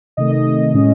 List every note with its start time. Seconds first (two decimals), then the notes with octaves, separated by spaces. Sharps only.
0.17 C3 D#3 A3 D#5
0.31 D#5
0.74 A2 G#3 C#4